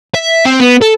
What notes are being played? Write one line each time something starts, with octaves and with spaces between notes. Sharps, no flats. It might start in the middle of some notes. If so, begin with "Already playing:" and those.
E5
C4
B3
A4